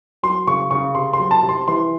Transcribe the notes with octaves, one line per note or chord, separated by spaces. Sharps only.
F#3 C6
C#3 C#6
C#3 C#6
C3 C6
C6
F#3
A5
C3
C6
E3 C6